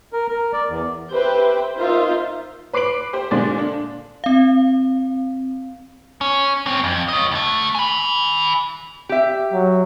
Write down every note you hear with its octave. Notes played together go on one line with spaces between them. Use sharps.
A#4
A#4
D5
E2
G4 B4 C5 E5 G5
D#4 F4 A#4 C5 E5 F5
B4 D6 C7 D7 F#7
G4 C5
A#2 D3 G#3 D5 C6 A6
D4
C4 F5
C#4
C4 C#4
F2
C#5 D#5
D2 A3
G#5 B5
G4 E5
F#3